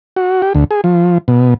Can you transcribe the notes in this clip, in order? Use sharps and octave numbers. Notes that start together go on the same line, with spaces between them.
F#4
G4
D2
G#4
F3
B2